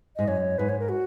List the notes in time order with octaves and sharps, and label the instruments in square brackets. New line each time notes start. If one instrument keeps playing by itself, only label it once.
[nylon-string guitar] G#2 [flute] D#5
[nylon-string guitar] F#2 [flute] C#5
[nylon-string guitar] G#2 [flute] B4
[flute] C#5
A#4
F#4